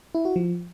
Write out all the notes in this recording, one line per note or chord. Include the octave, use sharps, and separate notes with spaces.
E4
F#4
F3